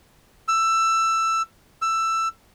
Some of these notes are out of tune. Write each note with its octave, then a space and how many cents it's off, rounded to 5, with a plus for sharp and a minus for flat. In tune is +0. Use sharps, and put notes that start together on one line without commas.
E6 +15
E6 +15